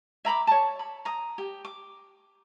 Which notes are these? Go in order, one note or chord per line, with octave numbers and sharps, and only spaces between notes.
E5 A#5 B5 D6
C#5 A5
B5
A#5 D#6
G4
D6